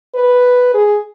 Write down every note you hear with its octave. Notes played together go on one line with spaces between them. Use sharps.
B4
G#4